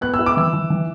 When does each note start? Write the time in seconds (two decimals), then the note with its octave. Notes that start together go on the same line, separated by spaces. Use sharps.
0.01 B3 F#6
0.14 E6
0.19 E4
0.26 D6
0.37 E3 E6
0.54 E3
0.70 E3